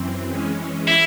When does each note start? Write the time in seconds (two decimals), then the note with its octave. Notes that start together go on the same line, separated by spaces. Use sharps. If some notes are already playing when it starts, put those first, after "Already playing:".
Already playing: F#2 E3 C4
0.29 E3 G#3 C#4
0.88 E4